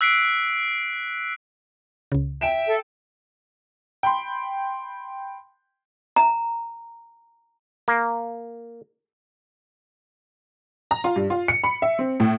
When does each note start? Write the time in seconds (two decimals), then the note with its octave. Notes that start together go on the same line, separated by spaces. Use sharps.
0.01 E6 F#6 B6 C7 D7
2.12 C#2 C#3
2.41 E5 G5 D7 E7
2.66 A4
4.03 G5 B5 C6
6.16 A#5
7.88 A#3
10.91 A#5
11.04 F4
11.16 G2
11.30 F4
11.48 C#7
11.64 B5
11.82 E5
11.99 C4
12.20 A2